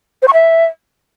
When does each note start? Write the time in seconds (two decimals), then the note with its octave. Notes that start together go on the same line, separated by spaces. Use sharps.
0.22 C5
0.28 C#6
0.33 E5